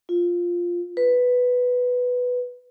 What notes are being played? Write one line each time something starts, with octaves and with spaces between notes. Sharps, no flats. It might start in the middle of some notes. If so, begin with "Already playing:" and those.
F4
B4